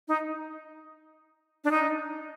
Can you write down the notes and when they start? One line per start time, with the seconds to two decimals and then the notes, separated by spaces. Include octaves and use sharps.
0.08 D#4
1.64 D4
1.71 D#4